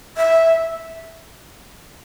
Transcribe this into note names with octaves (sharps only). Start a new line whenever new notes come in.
E5